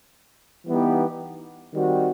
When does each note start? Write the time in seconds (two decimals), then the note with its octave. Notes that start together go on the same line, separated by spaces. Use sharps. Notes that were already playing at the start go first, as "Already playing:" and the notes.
0.66 E3 G3 B3 D#4 G4
1.74 D#3 G3 C4 F#4